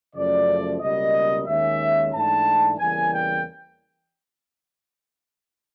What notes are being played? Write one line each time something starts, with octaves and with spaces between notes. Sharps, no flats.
F#2 C#3 F3 A3 D5
C#2 B2 G3 A#3 D#5
D#2 D#3 G#3 C#4 E5
G#2 E3 A3 D4 A5
E2 C#3 E3 G3 A#3 G#5
G5